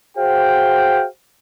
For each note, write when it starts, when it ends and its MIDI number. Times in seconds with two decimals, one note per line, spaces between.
0.18 1.05 66
0.18 1.05 68
0.18 1.05 72
0.18 1.05 77
0.18 1.05 79